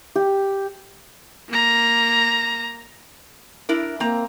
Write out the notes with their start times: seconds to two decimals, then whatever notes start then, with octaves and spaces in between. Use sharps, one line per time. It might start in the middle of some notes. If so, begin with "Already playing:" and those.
0.15 G4
1.50 A#3 A#5
3.69 D4 E4 A#4
4.00 A#3 C4 A#5